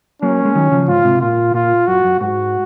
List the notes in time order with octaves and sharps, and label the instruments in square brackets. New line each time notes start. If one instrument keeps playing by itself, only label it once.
[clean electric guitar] F#3 A#3 [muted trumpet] C#4
[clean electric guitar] G#3
D#3 F#3
C#3 F3
[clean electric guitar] G#2 [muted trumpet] F4
[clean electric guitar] G#2 C3
[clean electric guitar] A#2 [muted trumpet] F4
[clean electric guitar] A#2 [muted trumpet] F4
[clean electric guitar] F#2 [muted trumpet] F#4
[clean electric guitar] F#2
[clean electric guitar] G#2 [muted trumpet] F#4